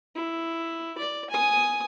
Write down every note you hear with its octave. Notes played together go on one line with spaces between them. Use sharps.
E4
D5
G#5 D#6